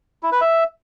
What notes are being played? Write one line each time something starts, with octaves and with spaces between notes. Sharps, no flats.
E4
B4
E5